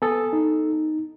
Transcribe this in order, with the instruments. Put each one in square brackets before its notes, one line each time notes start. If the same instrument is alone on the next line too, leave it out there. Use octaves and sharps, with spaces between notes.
[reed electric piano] B3 A4 [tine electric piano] G#5 D#6
[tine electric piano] D#4